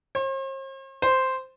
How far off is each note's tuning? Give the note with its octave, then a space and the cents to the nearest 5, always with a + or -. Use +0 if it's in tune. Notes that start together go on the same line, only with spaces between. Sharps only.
C5 +45
C5 -5